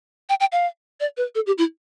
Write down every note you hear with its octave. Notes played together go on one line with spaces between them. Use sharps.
G5
G5
F5
D5
B4
A4
G4
E4